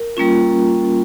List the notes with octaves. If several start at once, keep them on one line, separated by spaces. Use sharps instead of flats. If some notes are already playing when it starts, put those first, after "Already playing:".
Already playing: A#4
G3 A#3 C#4 F4